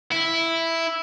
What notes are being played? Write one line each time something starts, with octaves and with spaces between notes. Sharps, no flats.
E4